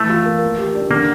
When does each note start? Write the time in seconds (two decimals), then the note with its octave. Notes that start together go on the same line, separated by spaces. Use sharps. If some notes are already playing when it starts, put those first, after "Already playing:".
Already playing: E3 A3
0.09 F4
0.26 A#3
0.42 A#3
0.58 G4
0.74 D4
0.90 D3 A#3